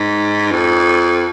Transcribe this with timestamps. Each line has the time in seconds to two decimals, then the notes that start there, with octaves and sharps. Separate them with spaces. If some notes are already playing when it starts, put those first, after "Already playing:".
Already playing: G#2
0.52 F2